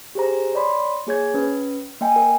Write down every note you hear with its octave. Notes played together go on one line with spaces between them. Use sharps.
G4 G#4 C5 A#5
C#5 D5 B5 C6
A#3 G#4 C#5 G#6
C#4 B4
A#3 D#5 G5 G#5
A#4